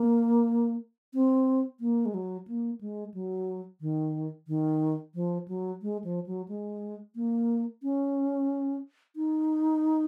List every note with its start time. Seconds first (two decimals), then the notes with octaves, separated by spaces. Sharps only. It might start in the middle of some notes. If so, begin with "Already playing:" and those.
Already playing: A#3
1.14 C4
1.80 A#3
2.05 G#3
2.14 F#3
2.48 A#3
2.81 G#3
3.14 F#3
3.81 D#3
4.48 D#3
5.15 F3
5.48 F#3
5.82 G#3
6.04 F3
6.26 F#3
6.48 G#3
7.16 A#3
7.83 C#4
9.16 D#4